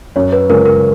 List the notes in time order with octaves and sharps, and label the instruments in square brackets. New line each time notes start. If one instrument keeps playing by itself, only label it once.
[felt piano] F#2 [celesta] C#5
[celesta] B4
[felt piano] C#3 G#3 C#4 F4 [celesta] A#4
[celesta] A#4